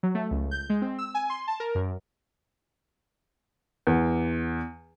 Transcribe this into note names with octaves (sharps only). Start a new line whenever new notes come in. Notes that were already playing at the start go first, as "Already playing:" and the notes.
F#3
A3
C#2
G6
G#3
C4
E6
G#5
C6
A5
A#4
F#2
E2